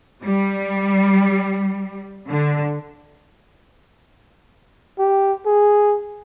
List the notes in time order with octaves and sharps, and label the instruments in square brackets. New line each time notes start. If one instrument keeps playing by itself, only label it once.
[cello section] G3
D3
[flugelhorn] G4
G#4